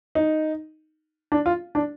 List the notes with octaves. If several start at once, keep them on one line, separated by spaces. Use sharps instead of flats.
D#4
D4
F4
D4